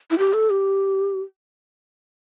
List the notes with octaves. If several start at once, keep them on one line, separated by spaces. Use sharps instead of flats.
E4
G4
A4
G4